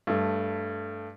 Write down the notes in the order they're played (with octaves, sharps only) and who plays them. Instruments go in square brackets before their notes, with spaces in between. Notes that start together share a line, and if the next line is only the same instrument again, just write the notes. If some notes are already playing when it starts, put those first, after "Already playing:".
[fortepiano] G2 A3